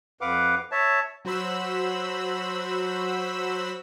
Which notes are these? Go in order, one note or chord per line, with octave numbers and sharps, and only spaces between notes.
F2 B4 F5 F#5 D6
C#5 E5 A5
F#3 F#4 C5 B5 E6